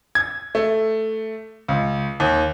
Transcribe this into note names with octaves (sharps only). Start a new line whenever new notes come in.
G#6
A3
C#2
D#2